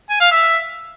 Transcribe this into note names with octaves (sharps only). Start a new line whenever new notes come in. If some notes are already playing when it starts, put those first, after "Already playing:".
G#5
F5
E5